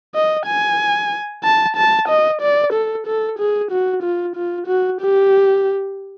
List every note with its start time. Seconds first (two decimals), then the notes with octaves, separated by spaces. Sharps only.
0.15 D#5
0.46 G#5
1.44 A5
1.77 A5
2.08 D#5
2.42 D5
2.73 A4
3.07 A4
3.39 G#4
3.71 F#4
4.03 F4
4.36 F4
4.67 F#4
5.01 G4